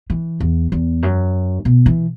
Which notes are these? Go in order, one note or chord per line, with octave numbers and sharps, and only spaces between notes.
E3
E2
E2
F#2
B2
E3